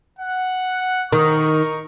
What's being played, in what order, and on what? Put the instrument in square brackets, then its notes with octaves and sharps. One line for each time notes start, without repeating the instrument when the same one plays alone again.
[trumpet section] F#5
[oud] D#3 [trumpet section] D#4 A#4 C#6